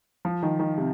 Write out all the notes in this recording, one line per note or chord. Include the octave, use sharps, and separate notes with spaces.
F3
D#3
D#3
C3